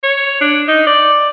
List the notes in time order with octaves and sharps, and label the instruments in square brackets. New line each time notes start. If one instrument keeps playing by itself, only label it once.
[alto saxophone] C#5
D4
D#4
D5